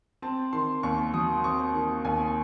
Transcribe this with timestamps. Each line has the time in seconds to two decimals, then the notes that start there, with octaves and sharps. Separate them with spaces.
0.22 C4 A5
0.53 D#3 C6
0.83 D#2 C#6
1.13 F#3 D#6
1.44 C4 C#6
1.74 D#3
2.05 D#2 G#5